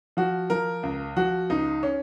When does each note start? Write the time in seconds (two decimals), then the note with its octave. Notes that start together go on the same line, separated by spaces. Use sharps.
0.17 F3 F#4
0.50 F3 A#4
0.83 C#2
1.16 F3 F#4
1.50 C#2 D#4
1.83 C#4